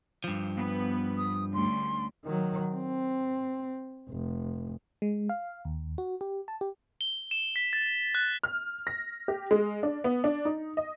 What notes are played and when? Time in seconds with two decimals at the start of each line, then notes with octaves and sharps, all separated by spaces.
0.24 G2 F3
0.55 B3
1.17 D#6
1.54 D2 G3 C#4 C6
2.25 D#3 F#3
2.75 C4
4.10 F1
5.02 G#3
5.29 F5
5.65 D#2
5.98 F#4
6.21 G4
6.48 A5
6.61 G4
7.01 G7
7.31 E7
7.56 B6
7.73 A6
8.15 F#6
8.43 F6
8.87 A#6
9.28 G4
9.51 G#3
9.83 D4
10.04 B3
10.24 D4
10.45 D#4
10.77 D#5